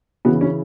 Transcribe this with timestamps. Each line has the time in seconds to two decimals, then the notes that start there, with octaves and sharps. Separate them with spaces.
0.25 C#3 E3 B3
0.41 C#4